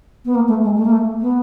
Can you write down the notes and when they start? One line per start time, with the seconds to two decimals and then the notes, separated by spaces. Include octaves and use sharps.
0.25 B3
0.35 A#3
0.48 A3
0.64 G#3
0.77 A3
0.85 A#3
0.92 A3
1.21 B3